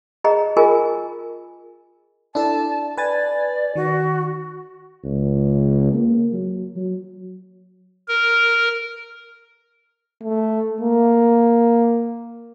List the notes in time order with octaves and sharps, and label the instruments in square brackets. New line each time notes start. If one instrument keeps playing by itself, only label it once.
[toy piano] G#4 D#5 A#5
F4 G#4 A#4 D#5 G#5
[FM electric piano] D4 E4 A4 [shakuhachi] A5
[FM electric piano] B4 G#5 A6 [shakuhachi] D5
[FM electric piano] D#3 [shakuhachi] F#4
[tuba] C#2
A#3
F#3
F#3
[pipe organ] A#4
[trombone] A3
A#3